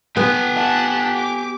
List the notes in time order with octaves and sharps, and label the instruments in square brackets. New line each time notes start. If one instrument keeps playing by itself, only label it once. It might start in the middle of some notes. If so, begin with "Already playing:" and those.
[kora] B3 [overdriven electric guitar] G4 G#5
[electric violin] F#5 A5
D6